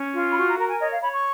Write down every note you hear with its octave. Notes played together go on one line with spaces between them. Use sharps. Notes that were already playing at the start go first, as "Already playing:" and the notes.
Already playing: C#4
F4
B5
F#4 C#6
A#5
A#4 A#5
G#5
C#5 D#5
F5
C#5 B5
C#6